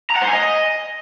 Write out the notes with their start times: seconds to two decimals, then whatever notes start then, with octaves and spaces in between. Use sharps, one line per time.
0.11 A#5
0.16 F#5
0.22 C5
0.28 G#5
0.33 D#5